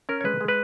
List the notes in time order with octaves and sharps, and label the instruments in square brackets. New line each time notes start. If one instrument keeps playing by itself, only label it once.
[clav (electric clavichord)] C#4 A#4
C#5
G#3 B4
G#3
B4